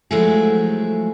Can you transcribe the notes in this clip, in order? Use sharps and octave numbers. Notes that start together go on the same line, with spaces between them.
F3 F#3 G#3 A3 E4 G#4